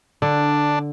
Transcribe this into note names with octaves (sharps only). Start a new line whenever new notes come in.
D3 D4